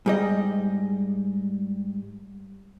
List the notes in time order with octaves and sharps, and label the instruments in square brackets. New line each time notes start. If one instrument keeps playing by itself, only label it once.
[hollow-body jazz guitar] G#2 G3 D#5